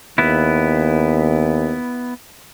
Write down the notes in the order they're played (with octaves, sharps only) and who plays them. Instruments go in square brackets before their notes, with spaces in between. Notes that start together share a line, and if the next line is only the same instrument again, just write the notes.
[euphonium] D#2 [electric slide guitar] B3 E4